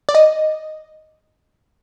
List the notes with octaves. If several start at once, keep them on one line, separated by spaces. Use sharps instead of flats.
D5
D#5